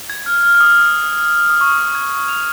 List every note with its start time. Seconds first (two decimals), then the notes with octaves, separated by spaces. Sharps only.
0.10 G#6
0.26 F6
0.43 F6
0.55 F6
0.61 D#6
1.50 D#6
1.61 C#6
1.78 D#6
1.95 G#6
2.28 F7